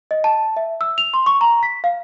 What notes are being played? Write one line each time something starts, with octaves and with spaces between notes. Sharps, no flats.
D#5
A5
E5
E6
F7
C6
C#6
A#5
B6
F5